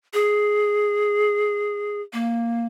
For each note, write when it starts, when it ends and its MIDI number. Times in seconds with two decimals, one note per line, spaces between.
0.14 2.01 68
2.13 2.66 58